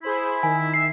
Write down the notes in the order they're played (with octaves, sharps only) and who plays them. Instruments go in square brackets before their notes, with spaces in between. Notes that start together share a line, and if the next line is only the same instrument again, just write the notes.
[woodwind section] E4 [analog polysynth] G#4 C5 B5
[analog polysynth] D#3 [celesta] G#5
[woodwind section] E5 [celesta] C7